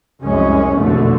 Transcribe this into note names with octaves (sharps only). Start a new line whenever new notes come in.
F1 C2 F#2 G#3 C#4
F1 A#1 E2 B2 D3 A3